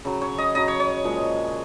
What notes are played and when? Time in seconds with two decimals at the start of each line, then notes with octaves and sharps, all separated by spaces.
0.05 C#3 F#3
0.22 C#5
0.38 D#5
0.55 C#3 F#3 D#5
0.68 C#5
0.80 C#5
1.04 A#2 F3 G#3